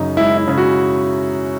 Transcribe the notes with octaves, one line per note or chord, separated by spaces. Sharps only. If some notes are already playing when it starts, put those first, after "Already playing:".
Already playing: F#2 C#3 D#4
G#3 E4
E4
C#3
F#4